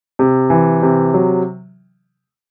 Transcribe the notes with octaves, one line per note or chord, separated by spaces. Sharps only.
C3
E3
C3
F#3